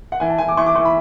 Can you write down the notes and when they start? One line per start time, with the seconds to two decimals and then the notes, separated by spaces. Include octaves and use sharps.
0.12 F#5
0.20 E3 G#5
0.30 A5
0.38 E3 G#5
0.48 D6
0.57 E3 C#6
0.66 D6
0.75 E3 C#6
0.85 B5